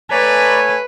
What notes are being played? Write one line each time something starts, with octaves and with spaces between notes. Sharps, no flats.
A3 B4 C#5 D5 G#5 A#5 B5